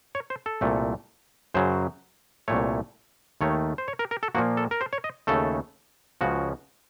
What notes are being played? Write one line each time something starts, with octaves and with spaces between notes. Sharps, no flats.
C#5
C5
A4
C2 A#2 A3
F#2 C#3 F#3 C5
C2 A#2 A3 C#5
D#2 D#3 A3 C#5
C5
C#5
A#4
A#4
A4
A#2 F3 A#3 F#4
A4
A#4
C5
C#5
D#5
D#2 C#3 A3 A4
C#2 C#3 F3 F#4